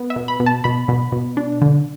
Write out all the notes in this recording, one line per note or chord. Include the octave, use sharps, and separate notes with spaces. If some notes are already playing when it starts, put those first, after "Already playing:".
Already playing: B3
E5
B2
B5
B2
A5
B2 B5
B2
B2
D4
D3